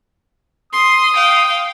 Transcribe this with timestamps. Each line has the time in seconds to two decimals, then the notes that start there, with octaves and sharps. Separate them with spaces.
0.73 C6 D#6
1.14 F5 G5